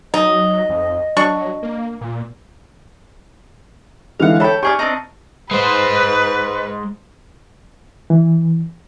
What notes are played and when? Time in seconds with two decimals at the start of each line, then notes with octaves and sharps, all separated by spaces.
0.14 F#3 D#4 D#5
0.69 F2
1.17 F#3 D4 C#6
1.63 A#3
2.01 A#2
4.19 D3 E3 G#3 F5 F#5
4.40 A4 C#5 G5 B5
4.63 G4 G#4 D5 C#6 F6
4.79 C4 D4 D#4
5.51 G#3 B4 C5
8.10 E3